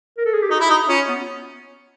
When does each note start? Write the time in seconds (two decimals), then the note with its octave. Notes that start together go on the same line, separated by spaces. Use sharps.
0.18 A#4
0.25 A4
0.34 G#4
0.42 G4
0.50 D#4 F#4
0.60 E4
0.70 D#4
0.89 C#4 F4
1.09 B3